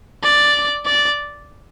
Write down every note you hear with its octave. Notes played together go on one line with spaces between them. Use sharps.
D5
D5